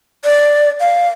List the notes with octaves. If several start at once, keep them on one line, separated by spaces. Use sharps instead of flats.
D5
F5